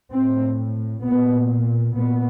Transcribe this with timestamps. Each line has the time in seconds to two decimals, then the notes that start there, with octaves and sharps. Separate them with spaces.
0.12 A2 C4
1.04 A#2 B3
1.96 A#2 B3